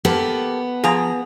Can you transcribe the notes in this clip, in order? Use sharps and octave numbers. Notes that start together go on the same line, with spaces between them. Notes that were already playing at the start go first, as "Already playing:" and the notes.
A#3 B3 G4 A4
F3 G#4 A#5